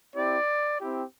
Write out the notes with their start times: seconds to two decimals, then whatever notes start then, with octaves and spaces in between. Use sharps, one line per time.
0.14 C4 E4 G4 D5
0.79 C4 E4 G4